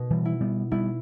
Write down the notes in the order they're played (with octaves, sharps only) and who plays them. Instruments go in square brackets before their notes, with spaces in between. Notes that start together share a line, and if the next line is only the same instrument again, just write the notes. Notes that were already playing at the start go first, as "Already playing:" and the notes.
Already playing: [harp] B2
[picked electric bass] E3 G3
[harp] E4
[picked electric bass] G3 B3
[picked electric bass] G3 B3 [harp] E4